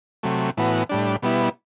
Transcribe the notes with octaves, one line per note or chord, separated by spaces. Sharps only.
C3 F#3 A3
A2 E3 B3 F#4
A2 G3 D4
B2 G3 B3 E4